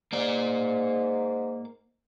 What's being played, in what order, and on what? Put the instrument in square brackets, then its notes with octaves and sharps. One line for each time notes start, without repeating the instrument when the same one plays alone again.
[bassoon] G#2 [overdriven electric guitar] A#3 D5